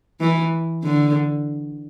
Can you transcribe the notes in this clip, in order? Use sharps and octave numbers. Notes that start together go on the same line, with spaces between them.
E3
D3